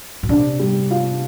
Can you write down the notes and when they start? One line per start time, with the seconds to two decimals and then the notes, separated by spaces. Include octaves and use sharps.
0.23 A#2
0.29 C3 D4
0.59 G3
0.91 F4